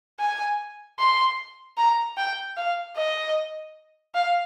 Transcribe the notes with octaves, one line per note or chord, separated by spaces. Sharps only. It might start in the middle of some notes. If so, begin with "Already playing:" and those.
G#5
C6
A#5
G5
F5
D#5
F5